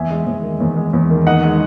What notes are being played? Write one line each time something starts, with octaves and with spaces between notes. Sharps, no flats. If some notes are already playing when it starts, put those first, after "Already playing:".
Already playing: E2 E5 G#5
G#3
E2
D#3
E2
G#3
E2
D#3
D#4 D#5 F#5
G#3